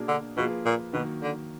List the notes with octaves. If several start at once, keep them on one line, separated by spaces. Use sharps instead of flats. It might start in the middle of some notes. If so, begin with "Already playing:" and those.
Already playing: B2 A#3 D4 G#4
D3
B2 F3 A#3 F4 G#4 B4
A#2
B2 D#3 F#3 A#3
D3